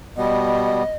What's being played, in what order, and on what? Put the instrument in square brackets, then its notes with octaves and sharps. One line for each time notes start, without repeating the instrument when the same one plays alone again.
[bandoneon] B2 G3 B3 [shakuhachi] D#5